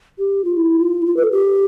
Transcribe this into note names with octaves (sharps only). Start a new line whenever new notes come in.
G4
F4
E4
F4
E4
F4
B4
A4
G4